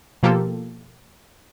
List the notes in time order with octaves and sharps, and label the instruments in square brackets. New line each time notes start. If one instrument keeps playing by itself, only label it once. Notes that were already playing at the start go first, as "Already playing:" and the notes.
[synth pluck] B2 F3 A#3 F4 G4 A4